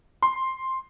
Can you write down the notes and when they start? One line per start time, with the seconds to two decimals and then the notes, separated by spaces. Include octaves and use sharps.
0.22 C6